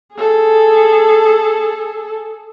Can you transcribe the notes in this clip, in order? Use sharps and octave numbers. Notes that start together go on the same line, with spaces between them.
G#4 A4